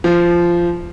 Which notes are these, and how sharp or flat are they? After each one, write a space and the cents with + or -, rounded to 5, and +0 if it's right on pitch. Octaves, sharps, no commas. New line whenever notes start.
F3 -15